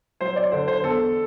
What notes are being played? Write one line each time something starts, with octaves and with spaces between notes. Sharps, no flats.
F#3 C5
D5
D3 C5
C5
E2 A4